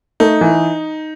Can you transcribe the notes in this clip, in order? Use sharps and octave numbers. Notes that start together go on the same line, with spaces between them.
A3 D#4
E3